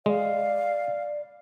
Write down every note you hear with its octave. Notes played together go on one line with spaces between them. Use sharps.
G#3 D5 F5